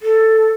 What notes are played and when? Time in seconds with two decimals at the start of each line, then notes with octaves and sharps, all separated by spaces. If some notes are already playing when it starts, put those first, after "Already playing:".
0.02 A4